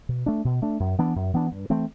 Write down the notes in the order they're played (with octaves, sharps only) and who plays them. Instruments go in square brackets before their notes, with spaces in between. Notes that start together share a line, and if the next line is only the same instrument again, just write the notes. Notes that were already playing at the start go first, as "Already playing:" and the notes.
[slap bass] B2
A3 D4
B2
A3 D4
F#2
E3 B3 D4
F#2
E3 B3 D4
G2
E3 A3 C4